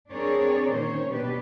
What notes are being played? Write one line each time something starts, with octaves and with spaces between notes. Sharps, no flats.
C4 D4 G#4 A#4 C#5 D5
A#2 D#3 C#4 C5 C#5
B2 B3 D4 G4 B4